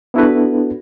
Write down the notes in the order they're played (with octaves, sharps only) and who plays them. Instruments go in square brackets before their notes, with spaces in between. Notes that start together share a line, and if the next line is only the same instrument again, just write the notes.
[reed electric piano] B3 D4 E4 F#4 A4 B4